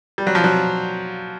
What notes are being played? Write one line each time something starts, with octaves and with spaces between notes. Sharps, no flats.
G3
F#3
F3
F#3